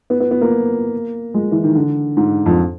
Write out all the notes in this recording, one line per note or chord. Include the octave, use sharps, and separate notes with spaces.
B3
B3
B3
A#3
G#3
E3
D#3
D3
G#2
F2